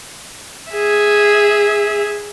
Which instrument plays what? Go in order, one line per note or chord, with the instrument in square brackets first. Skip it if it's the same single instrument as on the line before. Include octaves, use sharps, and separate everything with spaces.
[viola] G#4 E5